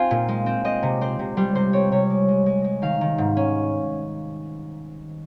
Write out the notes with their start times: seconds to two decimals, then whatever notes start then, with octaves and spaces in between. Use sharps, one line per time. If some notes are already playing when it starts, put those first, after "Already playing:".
Already playing: C4 F4 F5 G#5
0.11 A#2
0.28 G#3
0.46 C4
0.64 C4 D#5
0.83 C3
1.01 C4 C5
1.19 C3
1.37 G3 C5
1.55 C3 C5
1.73 C4 C#5
1.92 C3 C#5
2.10 G#3
2.28 G#3
2.46 G#3
2.64 G#3
2.82 D#3 F5
3.01 D#3
3.18 G#2
3.37 C#4